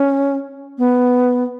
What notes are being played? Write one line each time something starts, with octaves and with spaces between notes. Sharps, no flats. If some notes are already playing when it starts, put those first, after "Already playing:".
Already playing: C#4
B3